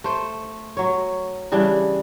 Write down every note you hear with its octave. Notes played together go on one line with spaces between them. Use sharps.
A3 C5
F#3 C#5
C#3 E3 G3 D4